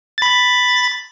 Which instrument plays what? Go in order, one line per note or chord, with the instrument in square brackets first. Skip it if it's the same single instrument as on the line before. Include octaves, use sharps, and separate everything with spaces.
[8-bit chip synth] B5 A6